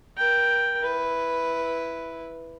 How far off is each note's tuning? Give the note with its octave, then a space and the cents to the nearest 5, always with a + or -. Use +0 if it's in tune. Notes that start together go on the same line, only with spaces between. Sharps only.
A#4 +35 G5 +0
E4 +0 B4 +0